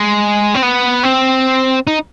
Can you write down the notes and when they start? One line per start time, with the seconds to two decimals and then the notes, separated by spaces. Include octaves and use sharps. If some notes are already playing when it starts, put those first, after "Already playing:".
Already playing: G#3
0.54 C4
0.62 B3
1.03 C4
1.87 D#4